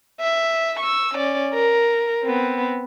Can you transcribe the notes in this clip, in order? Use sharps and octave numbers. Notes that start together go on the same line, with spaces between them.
E5
C#6 E6
C#4 D5
A#4
B3 C4